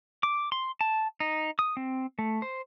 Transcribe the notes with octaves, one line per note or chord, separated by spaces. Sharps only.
D6
C6
A5
D#4
D#6
C4
A3
C5